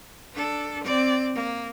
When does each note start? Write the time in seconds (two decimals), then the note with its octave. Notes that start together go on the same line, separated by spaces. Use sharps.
0.34 D4 A4
0.84 C4 D5
1.35 A#3